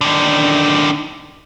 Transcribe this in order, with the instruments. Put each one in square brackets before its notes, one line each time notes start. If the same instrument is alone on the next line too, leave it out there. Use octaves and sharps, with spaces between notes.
[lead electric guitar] D3 D#3